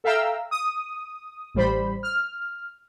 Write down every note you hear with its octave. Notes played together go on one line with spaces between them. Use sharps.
A4 E5 F5 G5 A#5 E6
D#6
A1 G3 C5 B5
F6